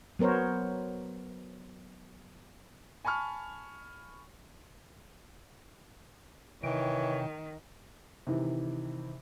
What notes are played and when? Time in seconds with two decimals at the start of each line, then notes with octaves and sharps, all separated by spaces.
0.19 F#3 B3 A#4 C5 C#5
3.05 G#5 A5 B5 C#6 F6
6.63 C3 D#3 E3 C#5 G5
8.27 C3 D#3 E3